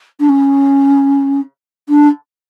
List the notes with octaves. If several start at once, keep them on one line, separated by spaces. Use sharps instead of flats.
D4
C#4
D4